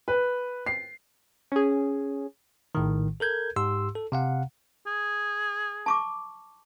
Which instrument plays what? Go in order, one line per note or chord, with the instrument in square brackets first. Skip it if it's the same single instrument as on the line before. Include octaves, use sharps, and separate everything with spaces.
[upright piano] B4
C7
[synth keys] C#4 G#4
[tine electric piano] A#1 A2 D#3
A4 A#4 G6 G#6
G#2 G4 C6 E6
A4
C3 F5 F#5
[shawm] G#4
[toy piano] A5 C#6 D6